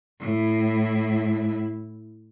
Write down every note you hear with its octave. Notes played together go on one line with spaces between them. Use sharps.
A2 E4